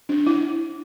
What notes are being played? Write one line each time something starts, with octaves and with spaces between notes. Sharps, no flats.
D4
E4